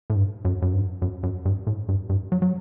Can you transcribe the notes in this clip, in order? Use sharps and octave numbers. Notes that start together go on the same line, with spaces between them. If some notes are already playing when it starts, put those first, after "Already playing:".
A2
G2
F#2
F#2
G2
F#2
F#2
G2
A2
G2
G2
F#3
F#3